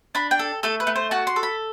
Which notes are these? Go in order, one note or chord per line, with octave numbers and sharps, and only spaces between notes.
D4 B5
G5
A4
A3 A4
B4
A3
C5
F#4 A5
C6
A4
B5